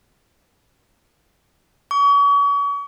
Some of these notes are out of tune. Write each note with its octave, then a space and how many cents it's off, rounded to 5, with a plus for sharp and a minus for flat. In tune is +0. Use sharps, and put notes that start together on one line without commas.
C#6 +40